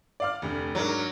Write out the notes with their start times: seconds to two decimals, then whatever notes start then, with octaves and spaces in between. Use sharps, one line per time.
0.20 D5 F5 F6
0.42 F1 D2
0.75 G#2 F#3 D4 A#4